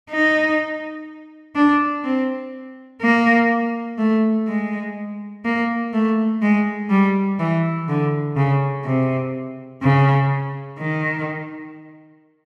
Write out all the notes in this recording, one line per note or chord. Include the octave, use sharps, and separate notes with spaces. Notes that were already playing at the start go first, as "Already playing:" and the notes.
D#4
D4
C4
A#3
A3
G#3
A#3
A3
G#3
G3
E3
D3
C#3
C3
C#3
D#3